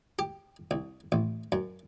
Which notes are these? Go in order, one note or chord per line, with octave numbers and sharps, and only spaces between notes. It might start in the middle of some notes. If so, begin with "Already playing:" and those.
G4
C2
A1
F#2